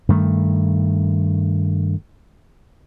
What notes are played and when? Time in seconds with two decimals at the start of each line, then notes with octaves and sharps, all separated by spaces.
0.09 G2 D#3 A3